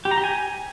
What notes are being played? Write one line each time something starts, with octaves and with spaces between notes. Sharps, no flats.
G4
A#5
G4
G#5